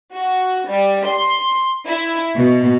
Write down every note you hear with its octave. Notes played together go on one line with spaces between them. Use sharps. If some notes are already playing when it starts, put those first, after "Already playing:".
F#4
G3
C6
E4
B2